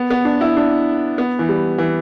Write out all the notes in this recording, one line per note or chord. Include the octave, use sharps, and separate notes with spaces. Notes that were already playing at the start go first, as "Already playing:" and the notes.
Already playing: B3
B3
D4
E4
D4
B3
E3
G3
E3